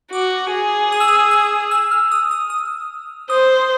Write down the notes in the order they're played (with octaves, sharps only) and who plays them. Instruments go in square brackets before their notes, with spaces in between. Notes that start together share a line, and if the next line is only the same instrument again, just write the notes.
[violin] F#4 [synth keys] D6
[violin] G#4
[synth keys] D#6
E6
D#6
E6
E6
F6
D#6
D#6
D#6
[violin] C5 [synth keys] D#6